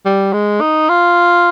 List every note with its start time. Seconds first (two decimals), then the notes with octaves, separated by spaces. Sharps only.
0.06 G3
0.33 G#3
0.61 D#4
0.89 F4